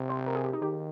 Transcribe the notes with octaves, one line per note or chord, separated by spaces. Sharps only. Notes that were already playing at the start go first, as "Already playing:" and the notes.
Already playing: C3
C5
A#4
G#4
G4
D#4
D#3 G4